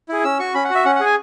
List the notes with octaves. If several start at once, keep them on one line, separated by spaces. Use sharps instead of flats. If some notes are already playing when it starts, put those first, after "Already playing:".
E4 G#4
C#4 E6
F#4 C#6
C#4 B5
F#5
F#4
E5
C#4 F#5
F#5
G#4
G#5